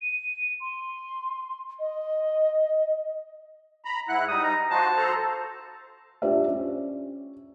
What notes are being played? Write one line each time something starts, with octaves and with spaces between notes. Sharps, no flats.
D#7
C6
D#5
A#5 B5
G#2 E4 F#5 F#6
G3 D#4 D#6
A#5
F3 F#4 C5 A5
A4 C5 A#5
D4 F4 G4 C5 D5 E5
C#4